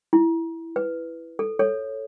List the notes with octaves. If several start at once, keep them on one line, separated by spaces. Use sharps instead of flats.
E4
B4
A4
A4 C#5